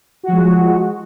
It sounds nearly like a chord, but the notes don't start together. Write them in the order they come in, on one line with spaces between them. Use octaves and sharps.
F#4 F3 G#3